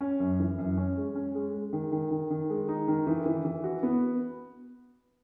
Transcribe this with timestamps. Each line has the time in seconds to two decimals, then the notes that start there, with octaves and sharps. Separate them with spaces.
0.01 C#4
0.20 F#2
0.40 E3
0.59 F#2
0.77 C#4
0.97 G#3
1.15 C#4
1.35 G#3
1.54 G#3
1.73 D#3
1.92 D#3
2.11 D#3
2.30 D#3
2.50 G#3
2.68 D#4
2.88 D#3
3.07 E3
3.26 E3
3.45 E3
3.64 F#4
3.83 B3